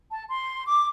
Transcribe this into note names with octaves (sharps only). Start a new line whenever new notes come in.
A5
C6
D6